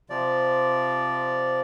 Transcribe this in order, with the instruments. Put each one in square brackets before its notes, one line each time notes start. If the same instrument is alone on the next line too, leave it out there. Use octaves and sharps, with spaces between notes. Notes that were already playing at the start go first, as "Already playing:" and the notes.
[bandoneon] C3 F3 D5